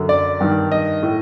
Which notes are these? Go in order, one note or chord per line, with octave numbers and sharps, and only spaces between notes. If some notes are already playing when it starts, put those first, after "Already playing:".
Already playing: F#2 D3
D5
G2 D#3
D#5
A2